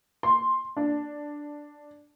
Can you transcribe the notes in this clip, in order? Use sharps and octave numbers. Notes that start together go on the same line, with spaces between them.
C6
D4